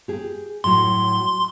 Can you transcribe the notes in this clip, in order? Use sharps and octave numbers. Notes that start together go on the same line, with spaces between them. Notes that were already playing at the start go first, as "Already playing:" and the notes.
G4 G#4
A2 F#3 C6